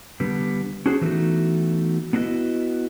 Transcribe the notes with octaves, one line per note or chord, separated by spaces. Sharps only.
D3 G3 B3
C#4 D4 F#4 G#4 C5
E3 F#3 A3 B3 D#4 F#4
B3 D4 E4 F#4 B4 D#5